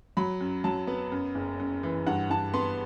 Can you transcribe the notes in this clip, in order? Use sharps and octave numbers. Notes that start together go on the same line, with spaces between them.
F#3 B5
F#2
F#3 A5
B3
F#2
F#1
F#2
E3
G2 F#5
G2 A5
B3 C6